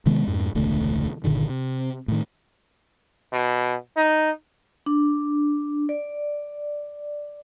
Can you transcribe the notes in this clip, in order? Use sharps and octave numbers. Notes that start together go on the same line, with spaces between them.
C3 D#3 G#3 B3
F2 G#2
E1 C#2 D3 A3
G1 A#2 D3 D#3
C3
A2 D#3
B2
D#4
D4
D5